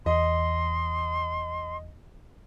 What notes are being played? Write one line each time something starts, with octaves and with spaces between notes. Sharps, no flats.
E2 D#5 C6